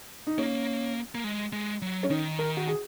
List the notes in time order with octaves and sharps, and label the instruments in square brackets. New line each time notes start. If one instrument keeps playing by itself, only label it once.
[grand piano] D#4
[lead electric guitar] A#3 [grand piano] C#4
[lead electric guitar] A#3
G#3
G#3
F#3
[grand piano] C#4
[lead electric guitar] D#3 [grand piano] D#4
[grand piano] A#4
F#4
G#4